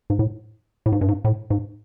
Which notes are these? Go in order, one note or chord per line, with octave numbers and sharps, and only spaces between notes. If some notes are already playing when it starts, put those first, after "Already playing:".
G#2
A2
A2
G#2
G2
G#2
A2
G#2